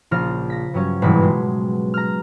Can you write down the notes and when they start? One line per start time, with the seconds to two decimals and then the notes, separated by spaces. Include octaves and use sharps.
0.11 A#1 C#3 F3 F4 F6 A#6
0.50 A#6 B6
0.74 G2 F#3 C#4
1.02 G1 G#2 B2 E3 B4 B6
1.19 F#3 G#3
1.94 A#5 F6